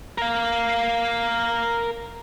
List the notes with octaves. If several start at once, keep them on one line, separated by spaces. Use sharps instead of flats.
A#4 F5